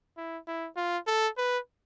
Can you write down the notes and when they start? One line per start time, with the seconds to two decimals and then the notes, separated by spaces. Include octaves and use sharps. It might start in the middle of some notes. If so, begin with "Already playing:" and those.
0.17 E4
0.48 E4
0.77 F4
1.07 A4
1.37 B4